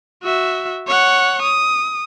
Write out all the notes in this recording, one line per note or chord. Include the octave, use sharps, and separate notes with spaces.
F#4 E5
C#5 F#5
D#6